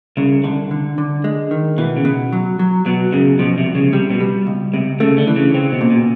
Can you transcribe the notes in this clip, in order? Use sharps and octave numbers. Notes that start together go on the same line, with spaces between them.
C2 C#3
C2 D3
D3
D3
G#3
D#3
B2 E3
C#3
B2
F#3
F#3
B2 F#3
F#2 C#3
B2 F3
C3
C2
C#3
C3 G3
B2
G3
C#2
C#2 C3
C#3 A3
D3
E3
C#3
C#3 C4
B2
A#2
B2